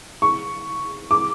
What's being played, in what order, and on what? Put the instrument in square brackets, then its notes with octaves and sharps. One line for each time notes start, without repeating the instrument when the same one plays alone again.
[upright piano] C#6
D6